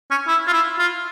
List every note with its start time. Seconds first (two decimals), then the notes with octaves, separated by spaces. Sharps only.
0.11 C#4
0.28 E4
0.47 F4
0.53 E4
0.79 F4